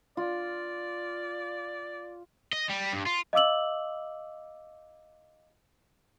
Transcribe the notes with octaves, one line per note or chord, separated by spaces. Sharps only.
F4 D5
D#5
G3
G2
F4
D#5 F5 D6 E6 F#7